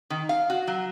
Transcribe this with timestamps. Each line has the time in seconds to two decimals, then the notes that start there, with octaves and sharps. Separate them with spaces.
0.10 D#3
0.29 F5
0.50 F#4
0.67 F#3